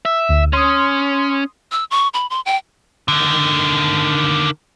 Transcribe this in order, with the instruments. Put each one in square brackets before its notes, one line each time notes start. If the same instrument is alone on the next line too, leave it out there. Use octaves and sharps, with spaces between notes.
[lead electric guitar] E5
[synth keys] D2
[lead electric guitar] C#4 [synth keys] C6 D#6
[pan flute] E6
C#6
B5
C6
G5
[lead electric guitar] D3 D#3